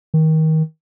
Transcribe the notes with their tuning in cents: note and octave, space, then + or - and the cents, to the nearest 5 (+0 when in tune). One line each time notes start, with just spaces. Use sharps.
D#3 +25